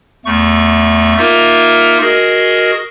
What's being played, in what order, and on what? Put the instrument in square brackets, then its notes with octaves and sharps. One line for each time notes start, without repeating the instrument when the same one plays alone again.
[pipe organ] E2 A3 C#6
A#3 D#4 F4 A#4 E5
F#4 G#4 A#4 D#5